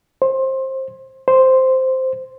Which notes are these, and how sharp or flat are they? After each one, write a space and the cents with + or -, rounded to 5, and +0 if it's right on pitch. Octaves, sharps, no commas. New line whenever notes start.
C5 +20
C5 -5